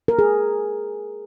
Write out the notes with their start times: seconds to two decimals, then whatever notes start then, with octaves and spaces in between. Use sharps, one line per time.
0.08 A#4
0.19 G#4